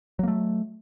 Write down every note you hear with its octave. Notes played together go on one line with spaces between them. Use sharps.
F#3 A3 A#3